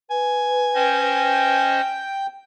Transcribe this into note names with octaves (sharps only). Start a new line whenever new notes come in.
B4 G#5
C#4 C5 D#5 G5